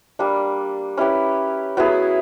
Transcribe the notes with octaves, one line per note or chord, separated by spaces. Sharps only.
G3 A#3 D4
C#4 E4 G4 B4
F#3 B3 E4 G#4